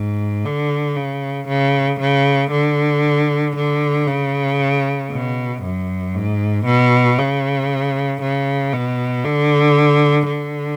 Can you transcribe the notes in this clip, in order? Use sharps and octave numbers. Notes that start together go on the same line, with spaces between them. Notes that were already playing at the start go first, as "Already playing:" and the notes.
Already playing: G#2
D3
C#3
C#3
C#3
D3
D3
C#3
B2
F#2
G#2
B2
C#3
C#3
B2
D3
D3